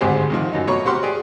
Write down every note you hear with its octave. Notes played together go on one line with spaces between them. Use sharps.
G#1 D2 G#2 G#3 G4 C5
C3 D#3 F3
F#2 F#3 D#4
B2 A3 C#5 A#5 B5 C#6
C4 F#4 G4 F#5 C6 F6
G4 G#4 D5